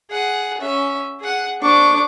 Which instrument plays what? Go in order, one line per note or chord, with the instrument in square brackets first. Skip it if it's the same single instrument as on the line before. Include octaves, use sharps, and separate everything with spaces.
[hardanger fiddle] G#4 F#5
C#4 E5
G#4 F#5
[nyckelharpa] D4 D6 [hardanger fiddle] C5 C#6